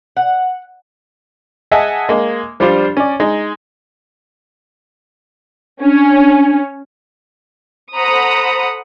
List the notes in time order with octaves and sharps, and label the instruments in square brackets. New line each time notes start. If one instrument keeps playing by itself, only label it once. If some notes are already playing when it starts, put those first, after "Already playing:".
[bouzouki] F#5
[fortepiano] G#4 D#5 E5 F#5 G#5 A5
G#3 A#3
F3 G3 D4 F4 C5
C#4 D5
G#3 D#4
[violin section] C#4 [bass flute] D4
[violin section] A4 C5 F#5 A#5 B5 D#6